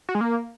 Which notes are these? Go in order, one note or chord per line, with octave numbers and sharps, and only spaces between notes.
F#4
G#3
A#3